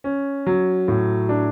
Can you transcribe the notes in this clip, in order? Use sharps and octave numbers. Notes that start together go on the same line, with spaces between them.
C#4
F#3
A2
D4